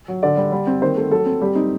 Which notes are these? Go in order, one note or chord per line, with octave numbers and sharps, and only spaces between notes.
F#3
D3 D5
G3
G3
C4
D#3 C5
A3
F#3 A4
C4
G3 G4
C4 D#4